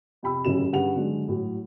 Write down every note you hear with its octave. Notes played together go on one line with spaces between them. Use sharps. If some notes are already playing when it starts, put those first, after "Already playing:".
F2 C3 G5 B5 E6
A1 F#2 C#3 F#3 E7
G2 C#3 F#5 F7
D3 F#3 G#3
A2 F#3